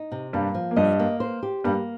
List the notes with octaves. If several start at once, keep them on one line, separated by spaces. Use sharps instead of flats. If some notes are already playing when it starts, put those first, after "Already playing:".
Already playing: D#4
C3
G2 G3 A#3
F3
A#3
G2 G3 D#5
A#3
C5
G4
G2 G3 A#3